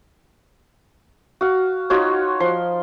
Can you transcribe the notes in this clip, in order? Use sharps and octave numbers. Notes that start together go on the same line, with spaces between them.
F#4 F5
D#4 F4 F#4 C#5
F3 C6